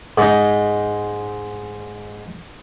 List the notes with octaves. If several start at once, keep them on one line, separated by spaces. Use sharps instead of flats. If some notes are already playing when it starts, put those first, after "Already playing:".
G#2 D#4